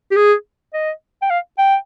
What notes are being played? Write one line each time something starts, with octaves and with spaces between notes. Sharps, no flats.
G4
G#4
D#5
G5
F5
G5